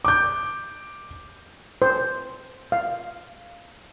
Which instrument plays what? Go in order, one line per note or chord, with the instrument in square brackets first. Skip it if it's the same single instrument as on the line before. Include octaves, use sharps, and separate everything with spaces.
[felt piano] D6 G6
[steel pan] C5
F5